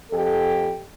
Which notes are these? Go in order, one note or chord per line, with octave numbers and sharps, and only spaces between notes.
F2 G4 A4